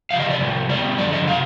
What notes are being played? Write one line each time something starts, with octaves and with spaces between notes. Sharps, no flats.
C3 F3 F5
D#5
D5
F2 C3 G3
B2 G3 D5
F2 D3 F3 D5
D#5
C3 F3 F5